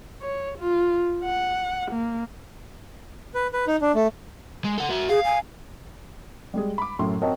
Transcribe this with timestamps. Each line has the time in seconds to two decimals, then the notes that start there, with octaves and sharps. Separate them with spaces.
0.22 C#5
0.58 F4
1.24 F#5
1.91 A#3
3.34 B4
3.53 B4
3.67 D#4
3.81 D4
3.95 A3
4.64 G#3
4.78 A4 F#5
4.90 F#4 E5
5.09 G#4 F5
5.25 G#5
6.54 G3 G#3 G#4
6.78 B5 D6
6.99 F#2 A2 C6
7.22 C4 F#4 A#4 C#5 D#5 A5